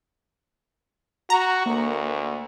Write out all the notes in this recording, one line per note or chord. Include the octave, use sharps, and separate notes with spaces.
F#4 A#5
D2 A#3